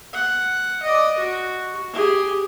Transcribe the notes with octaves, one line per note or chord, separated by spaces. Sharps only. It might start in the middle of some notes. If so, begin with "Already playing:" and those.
F#5
D5 D#5
F#4
G4 G#4